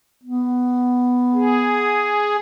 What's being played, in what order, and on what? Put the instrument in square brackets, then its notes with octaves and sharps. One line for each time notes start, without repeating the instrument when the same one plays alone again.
[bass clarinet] B3
[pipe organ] G#4